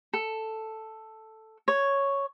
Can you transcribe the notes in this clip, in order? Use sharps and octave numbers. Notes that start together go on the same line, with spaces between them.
A4
C#5